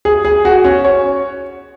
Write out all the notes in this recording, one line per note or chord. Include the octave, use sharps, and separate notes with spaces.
G#4
G#4
F#4
C#4
C#5